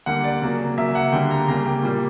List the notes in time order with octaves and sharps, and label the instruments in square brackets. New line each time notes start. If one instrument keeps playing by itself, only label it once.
[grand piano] D3 G3 A#3 F#5
D5
C#3 F#3 A#3
C#3 F#3 A#3 E5
F#5
D3 G3 A#3 G5
A#5
C#3 G3 A#3 A#5
G5
A#2 G3 A#3